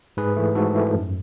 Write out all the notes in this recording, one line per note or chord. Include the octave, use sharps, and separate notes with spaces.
G#2 G#4 B4
E3 A3
G#2 F#4 A4
E3 A3 E4
F#2